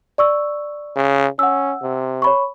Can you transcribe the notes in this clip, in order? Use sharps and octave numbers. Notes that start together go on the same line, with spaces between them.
D5 C#6 E6
C#3
C#4 F#5 E6
C3
C#5 B5 C#6